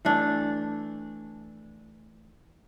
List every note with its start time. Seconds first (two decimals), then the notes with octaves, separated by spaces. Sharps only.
0.05 E3 A3 D4